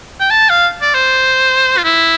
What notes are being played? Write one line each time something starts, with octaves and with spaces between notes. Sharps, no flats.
G5
A5
F5
D5
C5
F4
E4